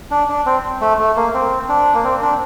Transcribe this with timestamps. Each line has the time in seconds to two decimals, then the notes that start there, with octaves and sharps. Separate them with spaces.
0.11 D4
0.29 D4
0.46 C4
0.81 A3
0.99 A3
1.16 A#3
1.34 C4
1.69 D4
1.94 A#3
2.04 C4
2.22 D4